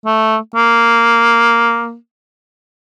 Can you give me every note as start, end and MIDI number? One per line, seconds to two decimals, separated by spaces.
0.06 0.37 57
0.56 1.96 58